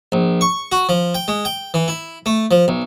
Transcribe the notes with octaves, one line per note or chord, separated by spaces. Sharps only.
A#1
C#6
F#4
F3
G5
G#3
G5
E3
E4
A3
F3
B1